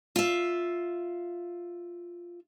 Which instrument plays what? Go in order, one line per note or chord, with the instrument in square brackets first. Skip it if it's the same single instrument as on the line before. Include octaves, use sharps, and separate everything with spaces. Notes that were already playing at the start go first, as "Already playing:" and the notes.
[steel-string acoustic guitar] F4 E5